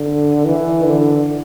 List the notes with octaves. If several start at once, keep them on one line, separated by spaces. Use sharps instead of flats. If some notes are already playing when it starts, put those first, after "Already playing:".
Already playing: D3
E3
D3